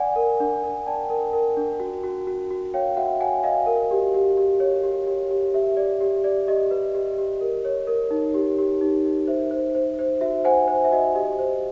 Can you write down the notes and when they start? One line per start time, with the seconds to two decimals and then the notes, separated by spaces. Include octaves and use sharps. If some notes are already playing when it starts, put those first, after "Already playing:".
Already playing: D5 F#5 G#5
0.16 A#4
0.40 D4
0.63 A#4
0.86 D5 G5 A5
1.10 A#4
1.33 A#4
1.57 D4
1.80 F#4
2.04 F#4
2.27 F#4
2.51 F#4
2.74 C#5 F5 G5
2.97 F#4 E5 F#5
3.20 F#4 F#5 G#5
3.44 F#4 D#5 F5
3.66 A#4
3.91 G4
4.14 G4
4.37 G4
4.60 C#5
4.84 G4
5.07 G4
5.31 G4
5.54 G4 E5
5.77 D5
6.01 G4
6.24 D5
6.47 G4 D#5
6.71 B4
6.95 G4
7.18 G4
7.41 A#4
7.65 C#5
7.87 A#4
8.11 D#4
8.34 G4
8.58 G4
8.81 D#4
9.05 D#4
9.27 C5 E5
9.51 C5
9.75 C5
9.99 C5
10.21 F#4 E5
10.45 C5 F#5 G#5
10.68 C5
10.84 E5
10.92 F#4 D#5
11.15 G4 D#5
11.39 C5